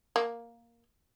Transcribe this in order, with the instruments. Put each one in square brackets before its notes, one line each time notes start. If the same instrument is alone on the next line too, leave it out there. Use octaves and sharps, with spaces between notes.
[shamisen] A#3